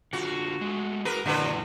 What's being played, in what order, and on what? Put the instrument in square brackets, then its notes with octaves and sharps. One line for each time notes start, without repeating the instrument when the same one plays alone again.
[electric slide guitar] D3 F4 [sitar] F#4
[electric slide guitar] G#3 A3
[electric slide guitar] F#4 G#4 [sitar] A#4 B4
[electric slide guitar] F#2 A#2 E3 [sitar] D3 F#3 B4